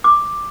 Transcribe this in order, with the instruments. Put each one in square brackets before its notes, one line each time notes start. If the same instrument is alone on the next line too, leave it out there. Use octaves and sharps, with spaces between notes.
[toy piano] D6